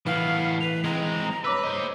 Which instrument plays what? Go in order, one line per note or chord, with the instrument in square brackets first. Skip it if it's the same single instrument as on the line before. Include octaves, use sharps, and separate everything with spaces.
[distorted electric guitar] A2 B3 [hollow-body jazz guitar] E3 [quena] F5
[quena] B4 [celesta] F7
[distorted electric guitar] G#3 C4 [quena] A#5
[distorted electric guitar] B4 [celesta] C#5 D6 E6
[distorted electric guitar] C5 D#5